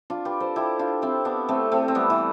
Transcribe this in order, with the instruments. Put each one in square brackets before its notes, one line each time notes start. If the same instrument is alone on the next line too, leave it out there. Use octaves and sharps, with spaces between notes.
[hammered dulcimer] D4 F4
G4 B4
A4 C5
E4 G4
D4 F4
C4 E4
B3 D4
A3 C4
A3 C4
C4
G3 B3
E3